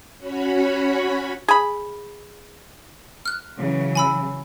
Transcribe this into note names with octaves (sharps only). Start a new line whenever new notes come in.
C#4 F#4 C#5 B5
G#4 B5
F6 F#6
C#3 E3 F#3
G#5 B5 E6